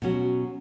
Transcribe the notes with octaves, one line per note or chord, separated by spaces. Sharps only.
B2 F#3 C#4 F#4